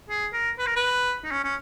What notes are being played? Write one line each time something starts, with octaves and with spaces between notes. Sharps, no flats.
G#4
A#4
B4
A#4
B4
D#4
C#4
C#4